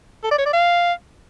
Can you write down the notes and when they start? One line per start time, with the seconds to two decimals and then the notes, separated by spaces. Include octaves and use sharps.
0.24 A4
0.31 D5
0.38 C#5
0.46 D5
0.53 F5